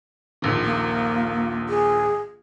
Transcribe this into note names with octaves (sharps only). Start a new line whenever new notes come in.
D#1 A#1 D#3
A#3
G#4